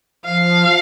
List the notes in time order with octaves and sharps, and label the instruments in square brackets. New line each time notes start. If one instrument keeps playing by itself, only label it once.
[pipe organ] F3 [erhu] F5